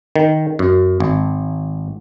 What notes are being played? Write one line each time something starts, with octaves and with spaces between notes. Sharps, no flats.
D#3
F#2
G#1